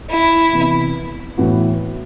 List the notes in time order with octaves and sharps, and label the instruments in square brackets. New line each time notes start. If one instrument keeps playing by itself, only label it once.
[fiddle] E4
[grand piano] C3 E3 B3
A2 E3 B3 F#4